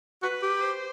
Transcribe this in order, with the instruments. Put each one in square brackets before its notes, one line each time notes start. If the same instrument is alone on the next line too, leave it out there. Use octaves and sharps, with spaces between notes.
[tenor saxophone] F#4 [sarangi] B4
[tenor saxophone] G4
[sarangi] C5